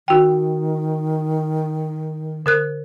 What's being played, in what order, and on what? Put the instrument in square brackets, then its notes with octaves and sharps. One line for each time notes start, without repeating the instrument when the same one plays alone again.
[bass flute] D#3 [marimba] F#4 G5
[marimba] D3 A#4 F#6